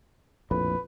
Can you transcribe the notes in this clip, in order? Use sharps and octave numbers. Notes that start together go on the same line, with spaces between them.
A#1 F2 A2 B4